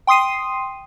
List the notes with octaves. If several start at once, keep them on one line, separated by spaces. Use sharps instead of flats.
G5 C6 D#6 C7 D#7